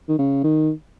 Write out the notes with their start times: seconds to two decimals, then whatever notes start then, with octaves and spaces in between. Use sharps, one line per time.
0.09 D#3
0.19 C#3
0.44 D#3